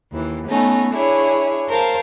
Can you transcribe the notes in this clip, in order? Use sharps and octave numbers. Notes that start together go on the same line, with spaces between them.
D#2 E3
A3 B3 C#4 D#4
D4 E4 G#4 C#5
A#4 C5 F5 A5